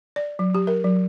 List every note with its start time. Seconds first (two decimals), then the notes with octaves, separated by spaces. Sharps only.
0.16 D5
0.39 F#3
0.55 G4
0.67 A#4
0.84 F#3